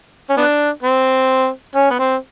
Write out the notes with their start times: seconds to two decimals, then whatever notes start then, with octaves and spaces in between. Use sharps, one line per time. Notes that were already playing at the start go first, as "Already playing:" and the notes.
0.30 C#4
0.37 B3 D4
0.83 C4
1.75 C#4
1.90 B3
1.99 C4